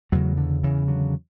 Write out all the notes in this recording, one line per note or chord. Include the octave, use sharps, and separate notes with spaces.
E2 C#3 F#3 A3
D3
E2 C#3 E3
D3 F#3